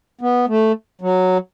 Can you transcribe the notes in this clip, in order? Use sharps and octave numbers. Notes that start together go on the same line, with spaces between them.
B3
A3
F#3